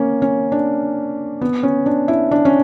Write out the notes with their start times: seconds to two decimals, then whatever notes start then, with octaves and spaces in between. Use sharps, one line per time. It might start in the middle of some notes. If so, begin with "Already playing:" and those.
Already playing: A#3 C#4
0.22 C#4
0.52 D4
1.41 B3
1.63 C#4
1.86 D4
2.08 E4
2.31 D4
2.45 C#4